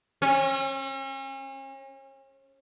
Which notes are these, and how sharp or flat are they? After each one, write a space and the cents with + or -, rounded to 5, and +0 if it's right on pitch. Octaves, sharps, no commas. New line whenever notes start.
C#4 -40